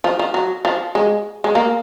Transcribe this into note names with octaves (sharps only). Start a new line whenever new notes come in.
F3
F3
F#3
F3
G#3
G#3
A#3